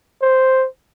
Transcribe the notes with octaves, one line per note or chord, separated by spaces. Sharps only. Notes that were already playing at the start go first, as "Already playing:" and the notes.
C5